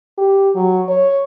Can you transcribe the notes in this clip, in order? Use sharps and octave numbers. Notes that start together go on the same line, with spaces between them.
G4
F#3
C#5